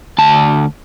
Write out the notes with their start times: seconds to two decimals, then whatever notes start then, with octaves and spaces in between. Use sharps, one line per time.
0.18 D2 A5